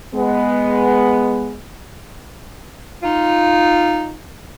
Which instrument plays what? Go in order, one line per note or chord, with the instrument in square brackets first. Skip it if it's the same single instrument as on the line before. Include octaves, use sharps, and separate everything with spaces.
[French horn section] G#3 B3
[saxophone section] D#4 F4